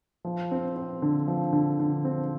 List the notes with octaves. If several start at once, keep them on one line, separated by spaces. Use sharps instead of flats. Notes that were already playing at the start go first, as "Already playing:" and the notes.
F3
C4
C4
D3
F3
D3
D3
C4